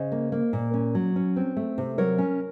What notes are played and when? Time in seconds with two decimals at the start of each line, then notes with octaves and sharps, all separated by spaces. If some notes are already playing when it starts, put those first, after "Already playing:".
Already playing: C#3 C5 D#5
0.12 A#3
0.32 A#3
0.53 A#2
0.74 C#4
0.95 F#3
1.16 C#4
1.36 C4
1.57 A3
1.78 C3
1.98 F#3 A#4 C#5
2.18 C#4